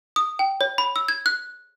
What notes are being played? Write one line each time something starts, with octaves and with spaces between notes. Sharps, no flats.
D#6
G5
C#5
B5
E6
G#6
F#6